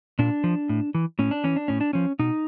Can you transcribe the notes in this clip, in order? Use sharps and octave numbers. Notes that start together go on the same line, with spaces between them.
A#2 D4
F3
A2
E3
A2 C#4
D4
E3 C#4
D4
A2 C#4
D4
F3 C#4
B2 D#4